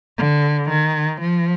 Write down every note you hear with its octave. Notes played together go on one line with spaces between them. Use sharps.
D3
D#3
F3